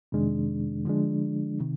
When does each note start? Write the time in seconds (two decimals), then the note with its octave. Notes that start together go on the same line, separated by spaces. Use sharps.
0.12 F2 C3 D#3 G#3 D4
0.85 D3 F3 G#3 D4
1.61 C3 D#3